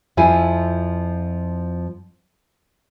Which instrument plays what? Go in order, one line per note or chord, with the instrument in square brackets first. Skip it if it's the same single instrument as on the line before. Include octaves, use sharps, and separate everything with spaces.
[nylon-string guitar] F2 F3 E4 F4 G#5